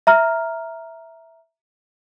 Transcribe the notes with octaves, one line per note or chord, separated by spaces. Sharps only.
E5 A#5 F6